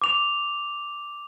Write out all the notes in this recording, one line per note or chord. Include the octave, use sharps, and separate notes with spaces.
D6 F7